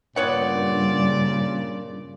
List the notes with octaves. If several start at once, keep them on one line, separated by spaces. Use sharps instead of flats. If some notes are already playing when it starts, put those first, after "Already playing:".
G2 A#2 C#3 B3 C#5 D5 F#5